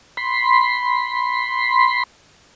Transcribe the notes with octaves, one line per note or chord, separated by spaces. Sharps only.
B5 C6